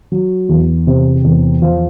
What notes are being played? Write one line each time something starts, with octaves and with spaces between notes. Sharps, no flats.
F#3
E2
C3
E2
F3